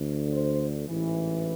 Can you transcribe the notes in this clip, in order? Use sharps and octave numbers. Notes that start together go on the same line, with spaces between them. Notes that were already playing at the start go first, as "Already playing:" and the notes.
Already playing: D2 D3
C5
A1 G#2 E3